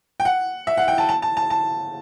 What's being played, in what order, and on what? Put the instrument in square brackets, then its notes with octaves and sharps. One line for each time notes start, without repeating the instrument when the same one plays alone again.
[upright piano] G5
F#5
E5
F#5
G5
A5
A5
A5
A5
A5